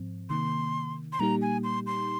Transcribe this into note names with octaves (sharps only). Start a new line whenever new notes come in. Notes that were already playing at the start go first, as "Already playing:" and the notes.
Already playing: G#2 F3 C4
C3 D#3 A#3 C6
C6
A#2 G3 A#3 D#4 G4 A#5
G#5
C6
C6